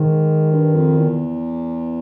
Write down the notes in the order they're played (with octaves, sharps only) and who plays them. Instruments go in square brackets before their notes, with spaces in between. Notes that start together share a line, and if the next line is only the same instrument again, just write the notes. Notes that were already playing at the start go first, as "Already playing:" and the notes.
Already playing: [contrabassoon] G#2 [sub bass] D#3
[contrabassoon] G2
F2
E2